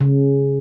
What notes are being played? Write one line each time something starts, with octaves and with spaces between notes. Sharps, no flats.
C#3